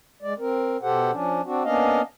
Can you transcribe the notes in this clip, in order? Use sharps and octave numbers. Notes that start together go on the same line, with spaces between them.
G#3 D5
C4 A#4
B2 G4 A4 C5 F#5
F3 C#4 D4
C4 D4 F#4
A#3 B3 C#4 D4 D#5 F5